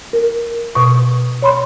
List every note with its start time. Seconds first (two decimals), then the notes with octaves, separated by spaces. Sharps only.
0.13 A#4
0.75 B2 C#6
1.42 C#5 B5 C6